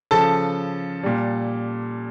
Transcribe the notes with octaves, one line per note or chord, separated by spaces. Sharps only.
C#3 F3 A4 A5
A#2 G3